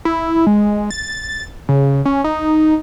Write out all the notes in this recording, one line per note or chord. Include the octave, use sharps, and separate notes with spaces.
E4
G#3
A6
C#3
C#4
D#4